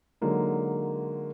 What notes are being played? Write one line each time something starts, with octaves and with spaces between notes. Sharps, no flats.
D3 F#3 G#3 A#3 D#4